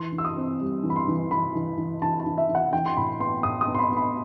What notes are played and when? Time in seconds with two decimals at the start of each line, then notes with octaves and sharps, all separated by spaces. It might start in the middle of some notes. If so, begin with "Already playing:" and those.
Already playing: E3 C6
0.13 E3
0.18 E6
0.25 D#6
0.37 C4
0.61 G3
0.83 E3
0.90 B5
0.96 C6
1.08 E3
1.31 E3 B5
1.55 E3
1.78 E3
2.02 E3 A5
2.20 A5
2.26 E3
2.38 E5
2.49 E3
2.55 F#5
2.73 E3 G5
2.86 C6
2.97 A2 B5
3.20 B3 C6
3.43 A2 D#6
3.61 D#6
3.67 B3
3.75 C6
3.79 B5
3.92 B3 B5